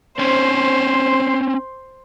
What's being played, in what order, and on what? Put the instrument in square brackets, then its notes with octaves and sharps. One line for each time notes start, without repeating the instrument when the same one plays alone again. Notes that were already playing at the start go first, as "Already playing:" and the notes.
[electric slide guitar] C4 C#4 [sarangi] C5